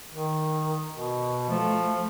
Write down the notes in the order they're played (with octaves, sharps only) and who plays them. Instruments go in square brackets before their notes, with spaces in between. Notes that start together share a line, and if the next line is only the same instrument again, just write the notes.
[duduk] D#3
B2
[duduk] F3 [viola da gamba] A3